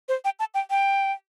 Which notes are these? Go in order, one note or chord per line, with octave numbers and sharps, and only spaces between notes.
C5
G5
A5
G5
G5